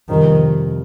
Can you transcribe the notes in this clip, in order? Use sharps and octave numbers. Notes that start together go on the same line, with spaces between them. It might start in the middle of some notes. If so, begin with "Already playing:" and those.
F2 C3 D#3 G3